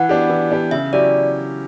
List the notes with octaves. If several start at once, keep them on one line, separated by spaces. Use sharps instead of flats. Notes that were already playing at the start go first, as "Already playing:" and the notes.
Already playing: E3 F#5
B3 D4 G4
E3
B3 D4 G4
C#3 E5
F#3 C#4 E4 G4 D5